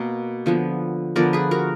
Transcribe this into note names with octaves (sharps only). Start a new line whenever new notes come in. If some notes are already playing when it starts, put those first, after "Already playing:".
Already playing: B2 A#3
D3 F3 B3
D3 F3 B3 A#4 D5
G#4 B4
F#4 A#4